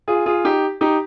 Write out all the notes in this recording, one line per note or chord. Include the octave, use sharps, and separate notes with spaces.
F4 G#4
F4 G#4
D#4 G4
D#4 G4